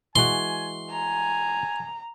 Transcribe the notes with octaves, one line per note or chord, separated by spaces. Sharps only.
E3 G#3 F#4 G#5 C6
G#5 A#5